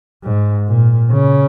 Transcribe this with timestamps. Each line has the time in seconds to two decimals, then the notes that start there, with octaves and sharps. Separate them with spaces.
0.24 G#2
0.68 A#2
1.12 C#3